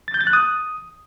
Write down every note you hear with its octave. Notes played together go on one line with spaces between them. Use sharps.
A6
G6
A6
F#6
D#6